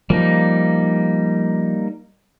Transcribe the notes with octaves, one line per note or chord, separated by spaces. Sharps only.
F3 G3 A#3 D#4